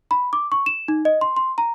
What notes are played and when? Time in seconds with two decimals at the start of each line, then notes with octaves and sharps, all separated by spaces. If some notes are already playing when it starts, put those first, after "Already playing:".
0.11 B5
0.33 D6
0.52 C#6
0.66 E7
0.88 D#4
1.05 D#5
1.21 C6
1.36 C6
1.58 A#5